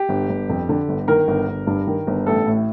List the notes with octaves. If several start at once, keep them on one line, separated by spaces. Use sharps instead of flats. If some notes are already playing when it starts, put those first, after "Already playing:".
Already playing: G4
G1
G1
F2
D3
G1
D#3 A#4
G1
G1
G2
D#3
G1
A1 A4
A2